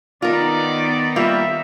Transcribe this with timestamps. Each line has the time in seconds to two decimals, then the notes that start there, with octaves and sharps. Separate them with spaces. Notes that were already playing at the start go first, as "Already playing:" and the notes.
0.22 D#3 B3 D#4 F4 A#4 D5
1.16 G3 A#3 F4 E5